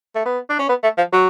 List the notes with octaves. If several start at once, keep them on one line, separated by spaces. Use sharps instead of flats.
A3
B3
D4
C#4
B3
A3
F3
F#3